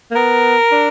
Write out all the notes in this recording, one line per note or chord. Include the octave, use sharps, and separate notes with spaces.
A#3
B3 A#4
D4